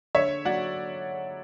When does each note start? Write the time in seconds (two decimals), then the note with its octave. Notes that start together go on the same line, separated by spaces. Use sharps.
0.15 D3 C#5 E5
0.45 F#3 D5 F#5